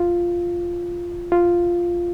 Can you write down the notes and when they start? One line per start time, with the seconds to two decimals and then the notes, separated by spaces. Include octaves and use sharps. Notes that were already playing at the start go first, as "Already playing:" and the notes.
Already playing: F4
1.32 F4